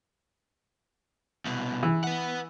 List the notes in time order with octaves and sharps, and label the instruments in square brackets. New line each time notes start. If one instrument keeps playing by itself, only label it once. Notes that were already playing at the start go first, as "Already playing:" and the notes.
[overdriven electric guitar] C2 B2
[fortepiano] E3
[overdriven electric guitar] B4 F#5